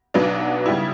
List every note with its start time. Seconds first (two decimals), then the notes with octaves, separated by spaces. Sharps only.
0.14 B1 B2 F#3 B3 D4
0.66 C#3 G3 B3 E4